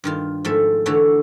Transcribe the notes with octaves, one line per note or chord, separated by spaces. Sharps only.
G2 D#3 F4
G#2 D#3 F3 A3 A4 E5
D3 E3 A3 E4 F#4 C#5